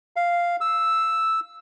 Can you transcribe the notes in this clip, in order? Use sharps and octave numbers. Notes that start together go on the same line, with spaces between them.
F5
E6